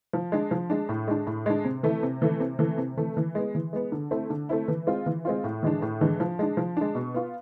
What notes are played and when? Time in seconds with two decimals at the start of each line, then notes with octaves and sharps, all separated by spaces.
0.13 F3
0.32 G#3 D4
0.51 F3
0.70 G#3 D4
0.89 A2
1.08 G#3 D4
1.27 A2
1.46 G#3 D4
1.65 C3
1.83 E3 A3 E4
2.03 C3
2.22 E3 A3 E4
2.40 C3
2.59 E3 A3
2.78 C3
2.97 E3 A3
3.17 E3
3.35 G#3 B3
3.55 E3
3.73 G#3 B3
3.92 D3
4.11 A3 C4 E4
4.30 D3
4.49 A3 C4 E4
4.68 E3
4.87 G#3 C4 F4
5.06 E3
5.25 G#3 C4 F4
5.44 A2
5.63 E3 G#3 D4
5.82 A2
6.01 E3 G#3 D4
6.20 F3
6.39 G#3 D4
6.57 F3
6.77 G#3 D4
6.95 B2
7.14 B3 F4